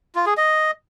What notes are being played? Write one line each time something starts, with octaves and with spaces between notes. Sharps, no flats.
F4
G#4
D#5